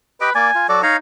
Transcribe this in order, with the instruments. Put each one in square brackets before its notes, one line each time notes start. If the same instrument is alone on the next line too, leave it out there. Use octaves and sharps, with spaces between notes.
[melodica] G4 D#5 G5 [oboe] B4
[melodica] A#3 D5 [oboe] G#5
[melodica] F4
[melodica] F#3 F#4 A4 [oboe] D5
[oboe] D#4 [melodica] C#5 F5 A#5